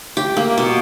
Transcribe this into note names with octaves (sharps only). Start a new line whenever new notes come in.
G4
A#3
B2